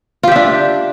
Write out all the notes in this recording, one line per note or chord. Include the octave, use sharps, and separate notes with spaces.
D4 F4 G4 E5